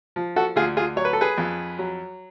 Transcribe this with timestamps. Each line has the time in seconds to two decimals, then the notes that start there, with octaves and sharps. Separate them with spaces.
0.16 F3
0.36 F#4 A4
0.56 D2 F4 G#4
0.77 F4 G#4
0.96 F#3 C#5
1.05 B4
1.13 A4
1.21 G#4 B4
1.38 F2
1.79 F#3